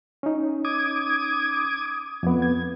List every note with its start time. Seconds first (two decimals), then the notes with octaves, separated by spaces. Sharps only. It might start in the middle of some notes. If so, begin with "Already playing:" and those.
0.23 C#4 D#4
0.65 D6 D#6 G#6
2.23 F2 B3
2.42 G#6